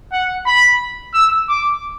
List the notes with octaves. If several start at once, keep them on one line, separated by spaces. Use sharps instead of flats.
F#5
B5
E6
D6